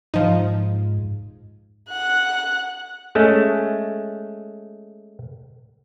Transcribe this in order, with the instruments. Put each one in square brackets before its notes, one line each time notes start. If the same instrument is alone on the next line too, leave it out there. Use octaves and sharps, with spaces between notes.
[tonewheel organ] G#2 [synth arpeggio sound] F3 D#4
[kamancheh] F#5 F#6
[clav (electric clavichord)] G#3 A3 C#4